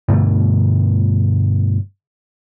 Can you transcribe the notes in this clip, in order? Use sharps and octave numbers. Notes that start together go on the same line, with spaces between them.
G2 B2 D3 A3